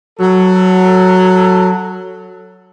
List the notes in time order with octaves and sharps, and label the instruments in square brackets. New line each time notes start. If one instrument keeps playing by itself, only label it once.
[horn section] F#3 A4